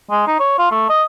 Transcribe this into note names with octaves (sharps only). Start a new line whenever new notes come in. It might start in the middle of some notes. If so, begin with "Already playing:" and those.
G#3
D#4
C#5
F4
A3
D#5